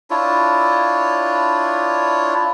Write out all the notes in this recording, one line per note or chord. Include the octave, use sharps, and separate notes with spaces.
D4 E4 F4 C#5